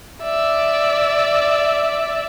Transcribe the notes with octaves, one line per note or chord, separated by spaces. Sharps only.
D5 E5